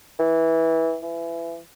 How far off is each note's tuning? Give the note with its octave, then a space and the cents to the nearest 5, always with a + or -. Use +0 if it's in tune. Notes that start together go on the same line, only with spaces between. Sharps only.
E3 -15
E3 +25